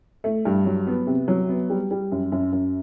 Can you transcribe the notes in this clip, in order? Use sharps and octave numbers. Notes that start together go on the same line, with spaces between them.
A3
G2
F#3
B3
C3
F#3
B3
G3
G3
F#2
F#2
F#2